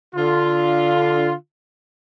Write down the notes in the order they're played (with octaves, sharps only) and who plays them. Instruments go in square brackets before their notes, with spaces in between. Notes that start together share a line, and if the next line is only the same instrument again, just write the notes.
[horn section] D3 F4